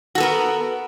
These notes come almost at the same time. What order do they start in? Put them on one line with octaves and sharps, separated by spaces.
F#4 A4 B3 A#4